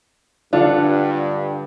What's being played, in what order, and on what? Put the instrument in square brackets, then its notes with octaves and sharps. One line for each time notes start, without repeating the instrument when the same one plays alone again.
[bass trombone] G2 [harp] D3 A4 F#5 [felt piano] D4 [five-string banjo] F4